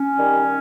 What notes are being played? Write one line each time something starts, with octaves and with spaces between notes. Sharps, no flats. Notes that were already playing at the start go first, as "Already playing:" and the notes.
Already playing: C#4
D#3 G3